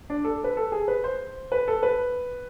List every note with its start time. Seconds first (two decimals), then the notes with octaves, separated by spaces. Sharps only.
0.10 D4
0.24 A4
0.44 B4
0.57 A4
0.72 G#4
0.88 B4
1.04 C5
1.52 B4
1.68 A4
1.83 B4